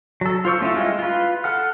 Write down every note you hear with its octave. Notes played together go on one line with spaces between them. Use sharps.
F#3 A4
F4 C5 C#6 E6
A3 C#4 E4 F4
G3 G#3 E4 F4
F4 B4
A4 F#5 F6